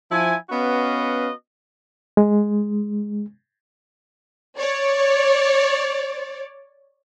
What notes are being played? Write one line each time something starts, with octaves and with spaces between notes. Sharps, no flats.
F3 E4 G#5
B3 C#4 F#4 B4 D#5 F5
G#3
C#5 D5